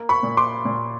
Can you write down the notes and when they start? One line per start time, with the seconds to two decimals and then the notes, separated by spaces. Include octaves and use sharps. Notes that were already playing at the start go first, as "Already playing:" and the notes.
Already playing: A#3
0.09 B5 C#6
0.23 A#2
0.37 C6 D6
0.65 A#2